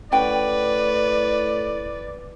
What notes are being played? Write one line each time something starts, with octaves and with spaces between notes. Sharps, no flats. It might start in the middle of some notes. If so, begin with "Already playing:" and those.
A2 C#4 B4 D5 F#5 G5